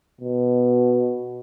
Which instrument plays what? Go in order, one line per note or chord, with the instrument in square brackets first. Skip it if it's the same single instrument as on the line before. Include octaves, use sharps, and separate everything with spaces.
[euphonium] B2